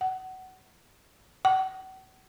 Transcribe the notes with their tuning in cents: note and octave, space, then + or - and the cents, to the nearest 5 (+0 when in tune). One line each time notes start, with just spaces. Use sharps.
F#5 +20
F#5 +40